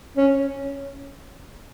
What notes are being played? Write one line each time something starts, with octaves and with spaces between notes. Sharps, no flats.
C#4